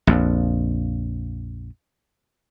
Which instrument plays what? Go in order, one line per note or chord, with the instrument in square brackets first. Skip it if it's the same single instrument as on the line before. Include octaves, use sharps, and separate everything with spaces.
[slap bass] A#1 F2